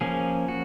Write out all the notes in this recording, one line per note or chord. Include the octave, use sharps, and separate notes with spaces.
F3 A#3 C#4 G#4
F#4